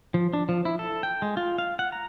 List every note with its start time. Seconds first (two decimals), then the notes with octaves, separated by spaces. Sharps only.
0.14 F3
0.33 D4
0.49 F3
0.65 E4
0.79 A4
1.03 G5
1.22 G#3
1.37 F4
1.58 F5
1.79 F#5
1.92 A#5